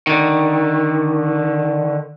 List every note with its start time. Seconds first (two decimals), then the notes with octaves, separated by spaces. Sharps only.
0.07 D3 D#3